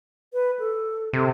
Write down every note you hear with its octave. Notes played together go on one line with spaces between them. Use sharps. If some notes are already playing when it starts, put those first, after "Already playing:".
B4
A4
C3 A4